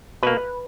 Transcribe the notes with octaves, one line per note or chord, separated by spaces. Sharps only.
B2 A#3 B4